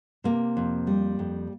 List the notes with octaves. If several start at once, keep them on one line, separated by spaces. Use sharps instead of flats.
C3 A#3
F2
G3
F2